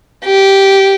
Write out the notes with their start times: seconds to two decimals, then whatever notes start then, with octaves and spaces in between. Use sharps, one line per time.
0.25 G4